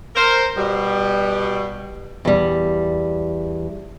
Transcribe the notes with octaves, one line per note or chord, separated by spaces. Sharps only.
A#4 C5
B2 G3
E2 G3